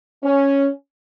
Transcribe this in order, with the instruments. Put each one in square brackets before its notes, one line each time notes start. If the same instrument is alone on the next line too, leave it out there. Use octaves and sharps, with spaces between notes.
[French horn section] C#4